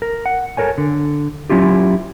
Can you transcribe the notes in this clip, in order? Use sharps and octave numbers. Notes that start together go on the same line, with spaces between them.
A#4
F#5
A4 A#4 C#5 G#5
D3
F#3 C#4 E4 F4 G4